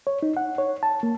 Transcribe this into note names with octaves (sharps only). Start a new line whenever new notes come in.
C#5
D#4
F#5
C#5
A5
A#3